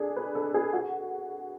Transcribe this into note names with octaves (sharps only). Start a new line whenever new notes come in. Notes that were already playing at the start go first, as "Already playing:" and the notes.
Already playing: D4 G#4 A4
B4
A4
G#4
F#4